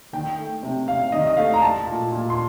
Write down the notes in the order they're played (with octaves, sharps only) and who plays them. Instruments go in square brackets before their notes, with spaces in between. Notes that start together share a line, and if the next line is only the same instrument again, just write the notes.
[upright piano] D#3 G5
A3
C3
C3 F5
D#3 D#5
D#5
A3 F5
A#5
A3 A5
A#2
A#2
C6